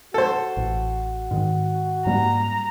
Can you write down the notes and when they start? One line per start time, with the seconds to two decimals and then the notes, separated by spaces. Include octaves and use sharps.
0.14 F#4 A4 C5
0.57 A1
1.31 G#2 D#3
2.06 G#2 G3 A#3 A#5